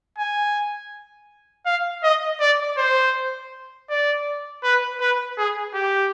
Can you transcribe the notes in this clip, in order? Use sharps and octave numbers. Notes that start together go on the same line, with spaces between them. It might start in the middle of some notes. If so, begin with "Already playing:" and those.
G#5
F5
D#5
D5
C5
D5
B4
B4
G#4
G4